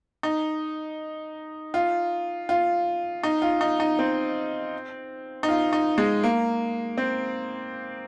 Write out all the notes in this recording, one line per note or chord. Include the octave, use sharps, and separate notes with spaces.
D#4
F4
F4
D#4
F4
D#4
D#4
C4
D#4
F4
D#4
G#3
A#3
C4